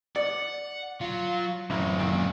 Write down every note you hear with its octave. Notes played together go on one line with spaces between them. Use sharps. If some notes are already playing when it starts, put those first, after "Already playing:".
D5 F#5
F#3 F4
A1 F#2 C4 D#4
C#2 A#2 D#3 C4